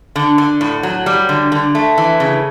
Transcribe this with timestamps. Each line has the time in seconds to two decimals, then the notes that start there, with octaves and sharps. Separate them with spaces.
0.16 D3
0.38 D3
0.61 A2
0.83 F#3
1.06 G3
1.29 D3
1.52 D3
1.75 A3
1.98 E3
2.20 C#3